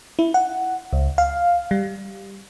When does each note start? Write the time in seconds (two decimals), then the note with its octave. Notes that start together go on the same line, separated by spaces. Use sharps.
0.19 E4
0.34 F#5
0.93 C#2
1.18 F5
1.71 G3